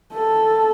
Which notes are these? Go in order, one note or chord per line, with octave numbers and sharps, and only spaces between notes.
A4